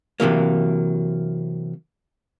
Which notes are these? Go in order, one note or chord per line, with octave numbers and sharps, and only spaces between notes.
C3 E3 F#3 A#3